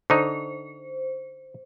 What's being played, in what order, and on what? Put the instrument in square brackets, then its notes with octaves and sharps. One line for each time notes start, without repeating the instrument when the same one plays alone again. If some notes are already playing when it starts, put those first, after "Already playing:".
[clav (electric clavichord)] D3 D#4 [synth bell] C5